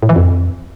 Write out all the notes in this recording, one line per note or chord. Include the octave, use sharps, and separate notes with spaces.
A2
E3
F2